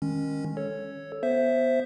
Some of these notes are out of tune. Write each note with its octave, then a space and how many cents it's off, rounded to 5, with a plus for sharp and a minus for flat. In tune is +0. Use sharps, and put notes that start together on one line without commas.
D#3 +5 G#3 -20 C#4 -5
A4 +0 C#5 +0
B3 -5 C5 +0 E5 +10